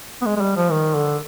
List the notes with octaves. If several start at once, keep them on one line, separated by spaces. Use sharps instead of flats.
B3
G#3
G#3
G3
F3
D#3
D3